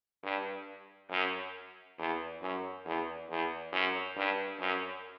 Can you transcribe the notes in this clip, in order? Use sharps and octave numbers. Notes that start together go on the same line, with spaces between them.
G2
F#2
E2
F#2
E2
E2
F#2
G2
F#2